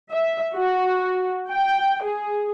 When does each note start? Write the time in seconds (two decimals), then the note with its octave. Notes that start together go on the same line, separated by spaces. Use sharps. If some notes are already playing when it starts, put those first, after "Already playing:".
0.10 E5
0.55 F#4
1.49 G5
2.04 G#4